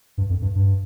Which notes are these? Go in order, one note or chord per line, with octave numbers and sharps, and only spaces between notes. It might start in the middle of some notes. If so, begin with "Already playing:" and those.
G2
F2
G2
G2